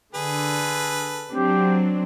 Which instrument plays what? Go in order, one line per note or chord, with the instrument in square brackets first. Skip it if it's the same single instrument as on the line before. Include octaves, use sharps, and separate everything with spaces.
[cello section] D3 [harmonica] G#4 A4 B4
[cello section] F#3 C4 D4 [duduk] G4